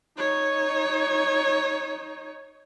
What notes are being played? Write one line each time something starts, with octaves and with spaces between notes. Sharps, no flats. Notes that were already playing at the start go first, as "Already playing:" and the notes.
D#4 C#5